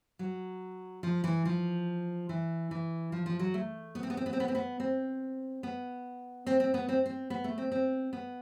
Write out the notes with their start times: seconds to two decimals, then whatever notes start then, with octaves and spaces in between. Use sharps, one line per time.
0.19 F#3
1.03 F3
1.24 E3
1.45 F3
2.29 E3
2.71 E3
3.12 F3
3.26 F3
3.39 F#3
3.54 A3
3.95 B3
4.03 C4
4.10 B3
4.17 C4
4.26 B3
4.33 C4
4.40 B3
4.48 C4
4.55 B3
4.80 C4
5.63 B3
6.47 C4
6.60 C4
6.74 B3
6.89 C4
7.06 C4
7.30 B3
7.44 A3
7.58 C4
7.72 C4
8.13 B3